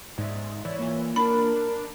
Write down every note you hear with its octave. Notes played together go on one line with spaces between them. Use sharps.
G#2 G#3 D5 E5
E3 C#5 D5
A#3 F4
D4 A#4 B5